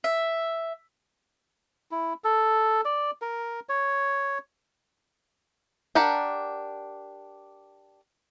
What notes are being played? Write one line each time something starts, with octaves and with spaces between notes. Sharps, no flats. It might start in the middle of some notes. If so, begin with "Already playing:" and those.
E5
E4
A4
D5
A#4
C#5
D4 G4 A#4 F#5 A5